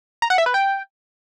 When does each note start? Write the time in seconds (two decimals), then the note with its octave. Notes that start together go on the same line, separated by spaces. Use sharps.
0.22 A#5
0.30 F#5
0.38 E5
0.46 B4
0.54 G5